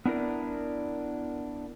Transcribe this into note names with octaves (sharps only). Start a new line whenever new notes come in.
B3 D4 E4 A#4 D5